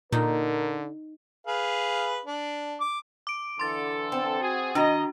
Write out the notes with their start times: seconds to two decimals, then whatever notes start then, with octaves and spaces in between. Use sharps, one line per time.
0.12 A#2 D3 D#4 A#4
1.47 G#4 B4 F5
2.26 D4
2.81 D6
3.27 D6 D7
3.59 D3 E3 A4 C6 A6
4.12 C4
4.41 F#4 G#4
4.75 D#3 D4 F#4 D#5 A#5